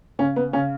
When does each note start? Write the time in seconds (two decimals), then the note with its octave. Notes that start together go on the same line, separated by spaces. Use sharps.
0.19 C#3 C#4
0.36 B3
0.53 C#3 C#4